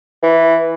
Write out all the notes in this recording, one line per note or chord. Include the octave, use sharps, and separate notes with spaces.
E3